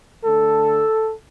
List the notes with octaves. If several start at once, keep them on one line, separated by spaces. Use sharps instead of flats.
D3 A3 A4